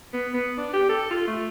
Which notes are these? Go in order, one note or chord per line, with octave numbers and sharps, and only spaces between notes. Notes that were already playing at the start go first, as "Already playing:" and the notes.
B3
B3
D4
G4
A4
F4
A3